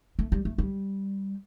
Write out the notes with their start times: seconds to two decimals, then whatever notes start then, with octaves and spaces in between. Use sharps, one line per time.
0.19 A3
0.32 G3
0.45 A3
0.58 G3